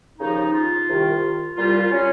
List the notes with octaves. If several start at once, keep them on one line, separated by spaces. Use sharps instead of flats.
D#2 C#3 F3 D#4
F4
C2 C3 D#3
C2 A#2 G3 F4
C#4